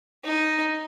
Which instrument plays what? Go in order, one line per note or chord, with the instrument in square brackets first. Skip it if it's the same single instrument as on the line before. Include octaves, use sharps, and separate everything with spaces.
[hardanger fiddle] D#4